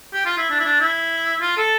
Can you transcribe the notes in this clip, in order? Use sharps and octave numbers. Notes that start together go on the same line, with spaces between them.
G4
F4
E4
D4
E4
D4
E4
F4
A4